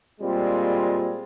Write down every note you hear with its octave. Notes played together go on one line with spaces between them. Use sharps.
A#2 G3 G#3 C4 F4